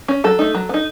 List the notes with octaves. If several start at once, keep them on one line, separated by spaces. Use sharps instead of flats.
C#4
F#3 A4
A3 D#4
F#3
B3
D#4